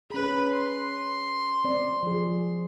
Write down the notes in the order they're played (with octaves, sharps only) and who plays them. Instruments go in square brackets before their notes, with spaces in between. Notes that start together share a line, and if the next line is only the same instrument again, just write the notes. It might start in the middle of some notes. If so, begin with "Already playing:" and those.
[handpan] C#4 G#4 [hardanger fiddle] B4 B5
[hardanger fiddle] C6
[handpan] C4 D5
F3 G#4